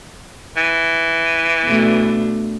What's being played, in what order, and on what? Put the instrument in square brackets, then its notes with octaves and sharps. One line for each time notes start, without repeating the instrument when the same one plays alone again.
[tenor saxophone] E3
[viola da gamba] B2 A3 D4